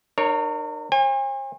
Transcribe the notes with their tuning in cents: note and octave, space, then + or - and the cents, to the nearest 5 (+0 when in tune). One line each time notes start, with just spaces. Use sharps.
D#4 -45 A#4 +0 C#5 +0
C5 +45 G#5 -40